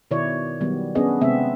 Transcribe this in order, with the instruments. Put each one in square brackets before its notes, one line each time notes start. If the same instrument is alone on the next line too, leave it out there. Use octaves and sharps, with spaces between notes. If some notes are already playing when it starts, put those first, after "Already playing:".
[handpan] B2 D#3 E4 C#5 D5
D#3 F#3 G3 B3
B3 C#4 D4 G#4 D#5
C3 G#3 B3 C4 E5